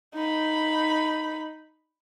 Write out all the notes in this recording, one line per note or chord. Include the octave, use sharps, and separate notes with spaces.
D#4 B5